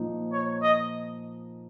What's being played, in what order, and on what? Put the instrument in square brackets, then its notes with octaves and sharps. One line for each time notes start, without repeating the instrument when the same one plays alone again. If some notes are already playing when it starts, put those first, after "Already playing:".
Already playing: [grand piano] A#2 F3 A#3 D#4
[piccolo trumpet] C#5
D#5